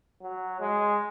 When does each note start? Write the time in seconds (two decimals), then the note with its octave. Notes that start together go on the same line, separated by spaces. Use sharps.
0.22 F#3
0.60 G#3